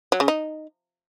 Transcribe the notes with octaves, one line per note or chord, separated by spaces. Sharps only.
F#3
C#3
D#4